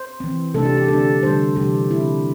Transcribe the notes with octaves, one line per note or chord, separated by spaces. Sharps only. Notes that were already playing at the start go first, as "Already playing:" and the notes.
Already playing: C5
E3 C4
C3 A3 D4 A4
G4
G4
D3 A3 D4 A4
D3 G3 D4 C5
C3 E3 G3 G4
D3 C4 E4